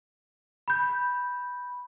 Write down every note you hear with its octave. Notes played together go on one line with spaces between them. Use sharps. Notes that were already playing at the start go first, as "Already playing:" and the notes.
B5 G6